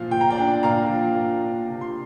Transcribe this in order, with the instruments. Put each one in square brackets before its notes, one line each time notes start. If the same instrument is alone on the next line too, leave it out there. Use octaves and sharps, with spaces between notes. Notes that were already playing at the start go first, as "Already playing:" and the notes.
Already playing: [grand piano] A#2 F3 F5
A#2 G5
A#5
D5 G5
D4
A#2 F5 A#5
F3
A#2
D4
C3
C6